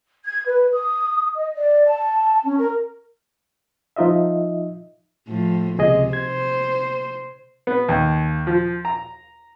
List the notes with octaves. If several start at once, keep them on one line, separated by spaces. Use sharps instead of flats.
G#6
B4
D#6
D#5
D5
A5
C#4
A#4
F3 D#4 F4 D#5 E5
A2 F3
C#2 C3 G#4 D#5
C5 G#6
B3
D#2
F3
A#5